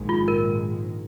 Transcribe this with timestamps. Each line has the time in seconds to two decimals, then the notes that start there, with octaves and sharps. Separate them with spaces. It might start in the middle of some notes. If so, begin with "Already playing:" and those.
Already playing: A#1 G#2 D#3 G#3
0.09 F4
0.28 A#4